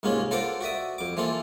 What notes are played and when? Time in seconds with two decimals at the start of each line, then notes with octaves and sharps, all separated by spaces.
0.03 C2 G#2 A#3 C#4 F4
0.31 F4 A4 A#4 C5 F#5 D6
0.61 F#4 D5 E5 D#6
0.98 F2 D6
1.17 E3 F3 A#3 F4 A4